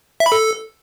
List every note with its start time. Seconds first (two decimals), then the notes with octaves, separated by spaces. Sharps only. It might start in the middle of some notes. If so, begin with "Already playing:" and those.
0.20 E5
0.26 B5
0.32 A4